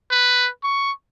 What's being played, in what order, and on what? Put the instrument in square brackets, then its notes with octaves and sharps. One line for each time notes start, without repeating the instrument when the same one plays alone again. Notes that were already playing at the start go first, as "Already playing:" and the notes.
[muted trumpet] B4
C#6